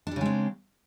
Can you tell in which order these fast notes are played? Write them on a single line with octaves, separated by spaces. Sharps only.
D4 G3 C#3 G#3 C4